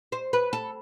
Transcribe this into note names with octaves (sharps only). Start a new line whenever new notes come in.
C5
B4
A4